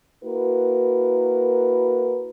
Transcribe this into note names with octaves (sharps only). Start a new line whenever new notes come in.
A#3 E4 F#4 A#4 B4